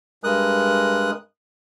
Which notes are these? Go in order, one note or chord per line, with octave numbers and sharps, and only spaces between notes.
G2 G#3 A#4 D#6 F#6